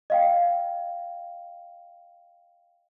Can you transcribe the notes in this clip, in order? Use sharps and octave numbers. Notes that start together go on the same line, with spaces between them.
D#5 F5 G5